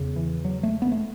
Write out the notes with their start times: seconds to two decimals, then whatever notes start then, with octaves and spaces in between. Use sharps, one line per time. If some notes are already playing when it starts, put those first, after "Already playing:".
Already playing: E2 C#3
0.16 E3
0.45 F#3
0.63 A3
0.82 B3
0.92 A3